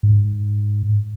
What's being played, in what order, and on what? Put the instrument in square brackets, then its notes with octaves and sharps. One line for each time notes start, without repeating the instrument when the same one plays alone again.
[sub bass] G#2